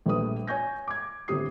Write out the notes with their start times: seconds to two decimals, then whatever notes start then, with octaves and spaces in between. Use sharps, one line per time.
0.06 A#1 G3 A3 B4 D#6
0.47 C#5 G#5 C#6 G6 A#6
0.88 D6 G#6
1.28 G1 A2 C4 G4 D#6 C7